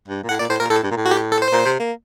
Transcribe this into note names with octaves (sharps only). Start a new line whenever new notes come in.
G2
A#2
A2 F#5
A#2 D5
A2 C5
A#2 A#4
A2 A4
G2
A#2
A2
F#4
G4
A4
C5
A#2
C3
A#3